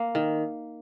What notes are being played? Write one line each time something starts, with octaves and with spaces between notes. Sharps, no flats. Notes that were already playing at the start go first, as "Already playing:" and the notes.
Already playing: A#3
D#3